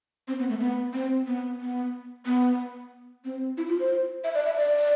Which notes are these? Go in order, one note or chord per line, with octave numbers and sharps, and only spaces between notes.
C4
B3
A3
B3
C4
B3
B3
B3
C4
E4
F4
C5
E5
D5
E5
D5